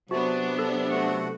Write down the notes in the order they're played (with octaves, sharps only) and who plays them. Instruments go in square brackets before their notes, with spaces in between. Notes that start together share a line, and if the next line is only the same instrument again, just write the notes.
[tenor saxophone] C3 [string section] F#3 B3 D4 [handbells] F#4 [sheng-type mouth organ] A5
[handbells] A4
[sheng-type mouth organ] A3 F#4 F#5